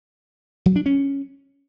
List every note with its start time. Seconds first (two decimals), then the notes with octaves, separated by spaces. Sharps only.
0.66 F#3
0.76 D4
0.86 C#4